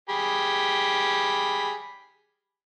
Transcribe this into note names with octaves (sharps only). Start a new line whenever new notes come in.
G4 G#4 B5